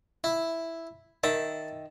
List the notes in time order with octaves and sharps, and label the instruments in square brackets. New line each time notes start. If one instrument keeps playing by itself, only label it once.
[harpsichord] E4
[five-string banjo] D#3 E5 [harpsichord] A5